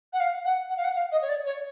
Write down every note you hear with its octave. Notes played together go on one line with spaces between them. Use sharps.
F#5
F5
F#5
F#5
F5
F#5
F5
D#5
C#5
D5
C#5